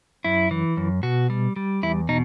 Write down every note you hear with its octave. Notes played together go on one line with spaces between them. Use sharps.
F#2 E4
E3
F#2
B2 F#4
G3
G3
E2 E4
B2 D#4